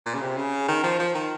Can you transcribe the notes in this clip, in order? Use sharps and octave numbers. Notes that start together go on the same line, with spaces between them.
A#2
C#3
C3
C#3
D#3
F3
F3
D#3